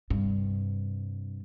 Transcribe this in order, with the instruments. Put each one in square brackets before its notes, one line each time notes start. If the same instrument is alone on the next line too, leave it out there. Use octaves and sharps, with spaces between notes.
[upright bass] G2 C3